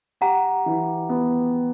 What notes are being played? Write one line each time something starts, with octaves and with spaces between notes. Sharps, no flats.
G4 F#5 A#5
E3
B3